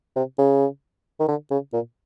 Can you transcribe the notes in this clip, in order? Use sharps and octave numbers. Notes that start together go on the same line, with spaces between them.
C3
C#3
D#3
D3
C#3
A#2